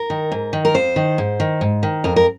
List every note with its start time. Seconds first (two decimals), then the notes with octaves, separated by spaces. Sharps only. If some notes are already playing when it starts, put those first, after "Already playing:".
Already playing: A#4
0.10 D#3
0.32 G#2
0.53 D#3
0.65 A#4
0.74 F2 C5
0.96 D#3
1.18 G#2
1.40 D#3
1.61 G#2
1.83 D#3
2.04 F2 A#4
2.16 A#4